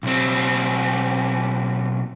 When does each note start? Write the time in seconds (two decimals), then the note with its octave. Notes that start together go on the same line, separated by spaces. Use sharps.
0.03 B1 C4